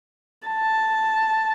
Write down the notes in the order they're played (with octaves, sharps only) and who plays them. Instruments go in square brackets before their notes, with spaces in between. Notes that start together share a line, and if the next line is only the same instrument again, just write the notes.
[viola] A5